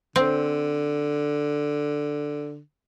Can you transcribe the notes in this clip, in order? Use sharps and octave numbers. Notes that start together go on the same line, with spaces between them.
D3 C4